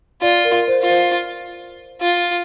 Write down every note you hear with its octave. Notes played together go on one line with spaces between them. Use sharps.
F4 D5
A#4
C5
F4
C5
F4